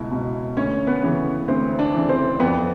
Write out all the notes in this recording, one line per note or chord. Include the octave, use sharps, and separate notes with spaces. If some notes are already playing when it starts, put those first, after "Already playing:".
Already playing: C#2 B2 E4
B2
D2 C#4 C#5
B3 B4
C#3 E3
D2 C4 C5
D4 D5
C#3 E3
C4 C5
F2 B3 B4